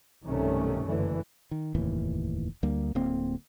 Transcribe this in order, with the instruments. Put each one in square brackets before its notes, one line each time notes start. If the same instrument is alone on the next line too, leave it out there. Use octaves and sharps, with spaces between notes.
[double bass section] B1 G2 C3 D#3 A3 C#4
F#1 D3 E3
[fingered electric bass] D#3
F1 D#2 A2 E3
D2 G3 A#3
D1 D3 A#3 C4